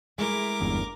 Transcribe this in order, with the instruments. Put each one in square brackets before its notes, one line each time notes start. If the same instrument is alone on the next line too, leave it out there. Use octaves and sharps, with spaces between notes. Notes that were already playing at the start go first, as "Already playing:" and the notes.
[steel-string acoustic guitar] G#3 A3 E4 [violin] A#4 D6
[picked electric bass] G1 E2 G2